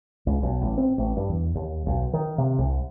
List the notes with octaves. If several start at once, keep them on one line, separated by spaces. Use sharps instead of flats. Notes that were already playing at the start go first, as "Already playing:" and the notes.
C#2
B1
A1
C4
A1
G2
E2
D#2
B1
D#3
C3
C2